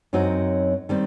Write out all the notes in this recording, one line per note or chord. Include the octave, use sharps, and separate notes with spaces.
F#2 F#3 C4 D#4 F#4
D#3 G3 C4